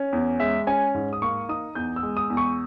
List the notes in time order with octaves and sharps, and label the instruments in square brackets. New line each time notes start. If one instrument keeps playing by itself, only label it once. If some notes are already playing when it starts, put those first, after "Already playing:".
Already playing: [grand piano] C#4
E2
G#3 E5
C#4 G#5
G#2
D#6
A#3 C#6
D#4 D#6
E2 G6
E6
G#3
D#6
E2
C#6